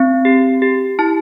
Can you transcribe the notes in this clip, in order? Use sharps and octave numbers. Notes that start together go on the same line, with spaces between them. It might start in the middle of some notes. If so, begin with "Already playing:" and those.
Already playing: C4
G4
G4
E4 A5